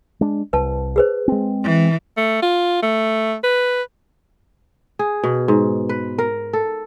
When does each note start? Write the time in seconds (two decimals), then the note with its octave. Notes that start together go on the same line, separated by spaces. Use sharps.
0.21 G#3 D4
0.53 C2 B4 A5
0.96 G#4 B4 C5
1.28 G#3 C4
1.64 E3
2.17 A3
2.42 F4
2.82 A3
3.44 B4
4.99 G#4
5.24 B2
5.48 G#2
5.89 B4
6.18 A#4
6.53 A4